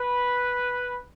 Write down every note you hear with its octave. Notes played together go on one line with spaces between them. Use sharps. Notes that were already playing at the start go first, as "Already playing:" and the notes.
Already playing: B4